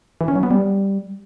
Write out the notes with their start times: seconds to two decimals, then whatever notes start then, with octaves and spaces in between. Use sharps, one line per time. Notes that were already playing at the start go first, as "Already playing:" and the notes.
0.21 E3
0.28 C#4
0.36 F#3
0.43 B3
0.51 G3